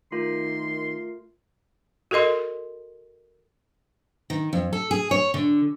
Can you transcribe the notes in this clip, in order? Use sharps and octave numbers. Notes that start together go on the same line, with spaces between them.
D#3 A3 F4 A#4 C6
F#4 A4 A#4 D#5 C6
D#3
F2
A4
G#4
C#5
D3